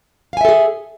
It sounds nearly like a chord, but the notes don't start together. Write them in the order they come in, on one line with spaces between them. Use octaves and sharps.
F5 G#5 E5 A4 G#4